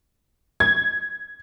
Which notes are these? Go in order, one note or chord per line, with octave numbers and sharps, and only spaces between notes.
G#6